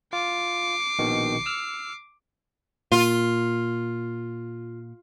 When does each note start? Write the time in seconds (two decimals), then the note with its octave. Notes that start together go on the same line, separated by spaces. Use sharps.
0.13 F4 D6 C7
0.99 A#1 B2 D#3
1.46 E6 F6
2.92 A#2 F4